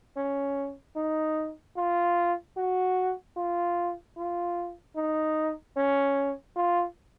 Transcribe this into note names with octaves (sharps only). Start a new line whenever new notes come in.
C#4
D#4
F4
F#4
F4
F4
D#4
C#4
F4